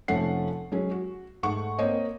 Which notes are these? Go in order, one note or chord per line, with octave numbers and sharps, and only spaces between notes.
F1 F3 A3 C#4 F#5 C7
F#3 G#3 C#4
F#4
G#2 A3 F#5 C#6
A#3 C4 C5 C#5 D#5